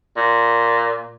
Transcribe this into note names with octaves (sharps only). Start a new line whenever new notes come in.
A#2